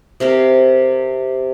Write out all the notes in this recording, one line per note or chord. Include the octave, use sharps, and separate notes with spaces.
C3 A#4 F5